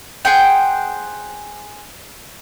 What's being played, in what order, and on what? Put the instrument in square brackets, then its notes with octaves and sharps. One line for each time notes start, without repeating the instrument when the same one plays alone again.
[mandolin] G#4 C5 F#5 G5